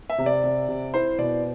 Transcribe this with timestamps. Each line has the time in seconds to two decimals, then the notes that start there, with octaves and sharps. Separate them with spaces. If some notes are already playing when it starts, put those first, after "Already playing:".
0.10 E5
0.18 C3
0.26 D5
0.44 C3
0.68 C3
0.94 E4 C5
1.18 B2 D5